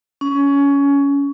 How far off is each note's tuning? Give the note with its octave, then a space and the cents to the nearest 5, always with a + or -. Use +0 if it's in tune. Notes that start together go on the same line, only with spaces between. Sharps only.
C#4 +20